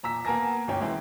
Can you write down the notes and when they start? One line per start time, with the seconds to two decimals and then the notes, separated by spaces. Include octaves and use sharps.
0.03 A#2 A#5 E6 B6
0.25 A#3 B3 A#4 G#5 A5 A#6
0.67 G1 D2 C#4 G5
0.81 E3 G#3 C4